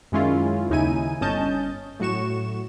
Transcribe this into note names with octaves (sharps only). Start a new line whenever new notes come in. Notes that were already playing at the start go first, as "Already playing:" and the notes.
F#2 D#3 G#3 C#4 E4 F4
D#2 C#3 D#4 E4 G#5 D#7
G1 C#4 D#5 A5 G6
A2 F#3 F#4 C#6 E7